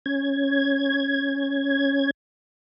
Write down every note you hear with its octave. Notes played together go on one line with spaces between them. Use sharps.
C#4 G#6